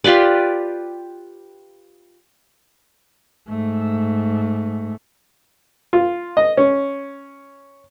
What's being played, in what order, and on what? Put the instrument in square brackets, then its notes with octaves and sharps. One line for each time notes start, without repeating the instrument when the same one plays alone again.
[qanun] F4 G4 B4 D5
[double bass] G#2 A3
[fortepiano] F4
D#5
C#4